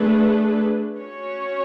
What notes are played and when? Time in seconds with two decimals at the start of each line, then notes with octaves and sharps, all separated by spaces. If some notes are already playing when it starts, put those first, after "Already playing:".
Already playing: A3 D4 G#4 B4
0.97 C#4 F#4 C#5